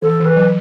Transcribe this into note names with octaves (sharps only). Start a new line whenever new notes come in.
E3 A4
E3
B4
F#3